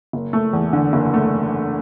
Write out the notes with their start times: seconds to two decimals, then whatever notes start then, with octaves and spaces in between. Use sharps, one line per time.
0.13 F#1
0.33 A3
0.53 E2
0.73 D3
0.93 F#1
1.14 A3